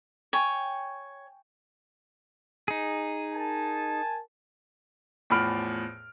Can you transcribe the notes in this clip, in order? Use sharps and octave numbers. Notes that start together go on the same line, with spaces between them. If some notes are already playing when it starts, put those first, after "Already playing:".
C#5 G5 G#5 C#6
D#4 G#4
A#4 G#5 A5
E2 A2 F3 B5 F6 D7